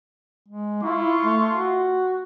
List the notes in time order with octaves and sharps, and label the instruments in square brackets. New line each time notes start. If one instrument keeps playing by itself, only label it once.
[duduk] G#3
[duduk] E4 [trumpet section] F4 C6 C#6
[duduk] A3
F#4